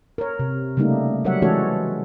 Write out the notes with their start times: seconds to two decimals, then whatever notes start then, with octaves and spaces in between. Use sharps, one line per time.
0.18 A#4 C#5
0.39 C3
0.77 C#3 G3 A3 A#3 D#4
1.25 F#3 G3 A#4 C#5 E5 F#5
1.42 E3 G#3 C#4 F#4 A4 C#5